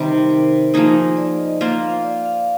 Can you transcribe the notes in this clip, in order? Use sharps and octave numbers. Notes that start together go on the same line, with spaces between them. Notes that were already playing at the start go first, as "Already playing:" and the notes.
Already playing: C3 D#3 G3 C5
A#4
C5
F3 A#3 D#4 G#4
D5
D#5
A#3 F4 C5 F5
F5
D5
F5